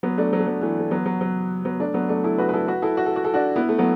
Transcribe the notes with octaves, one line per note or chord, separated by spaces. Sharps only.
F#3 B3
A3 D4
F#3
A3
F#3
E3 A3
A3
F#3 B3
F#3
F#3
F#3 B3
A3 D4
F#3 B3
A3 D4
E4 A4
F#4 B4
B4
E4 A4
F#4 B4
E4 A4
F#4
A4
F#4
A4
D4 F#4
B3 E4
A3
F#3 B3